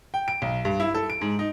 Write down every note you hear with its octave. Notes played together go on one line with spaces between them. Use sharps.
G5
D7
B1
G2
E4
A4
D7
G#2
D#4